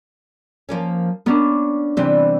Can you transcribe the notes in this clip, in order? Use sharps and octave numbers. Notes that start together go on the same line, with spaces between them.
F3 A#3 C#4
B3 C#4 D4 A#4
C3 E3 G3 C4